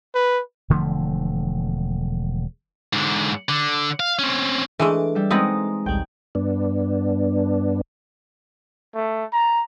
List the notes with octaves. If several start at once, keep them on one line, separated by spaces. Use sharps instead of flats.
B4
E1 D3 F3 A3
G#2 D3
D3
F5
C4 C#4
E3 G#3 A3 D4 A4
G3 E5
G#3 B3 C4 D#4 B4
A1 D2 G3 G5
G2 B3 D4
A3
A#5